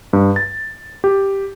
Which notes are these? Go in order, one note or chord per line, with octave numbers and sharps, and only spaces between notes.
G2
A6
G4